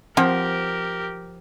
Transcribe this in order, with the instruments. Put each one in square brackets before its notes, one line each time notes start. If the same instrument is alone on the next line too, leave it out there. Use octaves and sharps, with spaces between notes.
[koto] F3 [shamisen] C4 F#5 [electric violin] G4 A#4